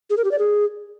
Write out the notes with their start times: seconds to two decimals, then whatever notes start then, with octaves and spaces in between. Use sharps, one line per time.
0.10 G#4
0.17 A#4
0.24 G4
0.31 D5
0.39 G#4